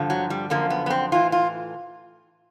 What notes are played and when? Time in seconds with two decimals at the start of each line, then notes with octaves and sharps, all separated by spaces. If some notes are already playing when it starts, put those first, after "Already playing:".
Already playing: G2 D3 F3
0.10 F#3
0.30 G3
0.50 F#2 D3 F3 A#3
0.70 B3
0.86 B3
0.90 C4
1.12 A2 E3 F4
1.32 F4